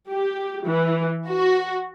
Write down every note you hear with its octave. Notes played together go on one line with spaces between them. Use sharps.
G4
E3
F#4